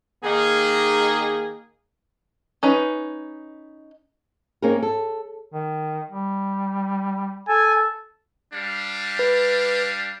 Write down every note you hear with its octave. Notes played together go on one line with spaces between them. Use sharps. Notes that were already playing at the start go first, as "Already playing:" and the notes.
D#3 A#3 D#4 G#4
C#4 D#4 B4
A#3 C4 C#4 D#4 G#4 A#4
A4
D#3
G3
A4 G#5
G3 D4 F5
B4